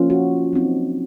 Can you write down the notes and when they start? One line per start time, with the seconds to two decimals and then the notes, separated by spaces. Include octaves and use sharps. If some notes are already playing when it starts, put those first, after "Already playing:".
Already playing: F3 A#3 C#4 F4
0.10 F#4
0.53 F#3 C4 D#4